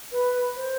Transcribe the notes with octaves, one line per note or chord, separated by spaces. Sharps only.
B4
C5